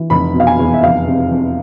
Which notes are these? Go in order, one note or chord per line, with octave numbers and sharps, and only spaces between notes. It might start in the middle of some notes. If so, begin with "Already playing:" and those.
Already playing: E3
F1 B5
B2
F5
G#5
E2
E5
F1 F5
C3
F2